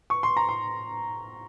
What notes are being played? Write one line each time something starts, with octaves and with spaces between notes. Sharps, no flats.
C#6
C6
A#5
C6